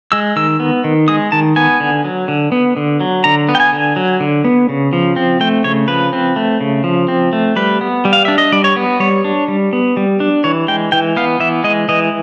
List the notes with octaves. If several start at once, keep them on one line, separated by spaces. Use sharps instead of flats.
G#3 E6
D#3 E6
B3
D#3
G#3 D#6
D#3 A5
B3 G#5
D3
F#3
D3
B3
D3
F#3
D3 A#5
B3
G5
G#5
D3
F#3
D3
B3
C#3
F3
C4
A3 G5
C#3 C#5
F3 B4
C4
A3
C#3
F3
C4
A3
G3 B4
B3
G3
F5
D4 E5
D#5
G3 D5
C#5
B3
G3 C#5
D4
G3
B3
G3
D4
E3 C#5
G#3 G5
E3 G5
B3 F5
E3 E5
G#3 D#5
E3 D#5